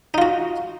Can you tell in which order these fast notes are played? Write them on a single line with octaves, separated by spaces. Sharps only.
D#4 F4 F#4